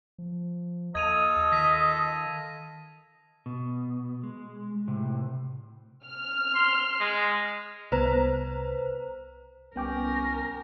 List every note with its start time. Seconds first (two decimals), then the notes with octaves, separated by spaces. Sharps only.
0.18 F3
0.95 D#2 F4 A4 D#5 G#6 D#7 F7
1.52 D#3 A#6 B6 D#7
3.46 B2
4.24 G#3
4.88 A2 C3
6.05 F6
6.54 C6
7.00 G#3
7.92 C2 B3 B4 C5 A#5
9.76 C2 B3 C#4 A#4 G5 D6